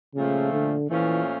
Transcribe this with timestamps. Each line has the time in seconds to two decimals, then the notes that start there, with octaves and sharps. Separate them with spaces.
0.15 A#2 C#3 F3 A3
0.52 D3
0.90 A#2 E3 F3 A3 C#4